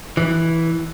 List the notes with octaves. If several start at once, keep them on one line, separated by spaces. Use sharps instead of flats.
E3